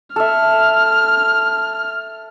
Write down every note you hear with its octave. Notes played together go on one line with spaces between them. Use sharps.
A4 E5 F6